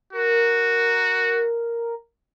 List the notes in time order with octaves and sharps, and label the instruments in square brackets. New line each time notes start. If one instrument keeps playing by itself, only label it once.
[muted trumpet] F#4 [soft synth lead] A#4